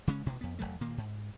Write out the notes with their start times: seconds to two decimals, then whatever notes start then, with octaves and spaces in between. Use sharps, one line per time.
0.07 C#3 G#3 C#4
0.26 A1 G2 B2
0.41 F2 B3
0.59 E1 F#2 F#3 A3
0.81 A#2 D#3 A#3
0.98 G#2